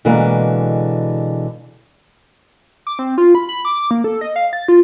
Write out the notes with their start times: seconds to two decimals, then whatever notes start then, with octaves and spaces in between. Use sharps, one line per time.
0.05 B2 D3 E3 G#3 A#3 G#4
2.87 D6
2.99 C4
3.18 F4
3.35 B5
3.49 B5
3.65 D6
3.91 A#3
4.04 A4
4.21 D#5
4.36 F5
4.53 A6
4.68 F4